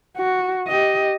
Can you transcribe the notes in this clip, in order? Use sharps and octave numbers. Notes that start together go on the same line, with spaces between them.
F#4
G4 D#5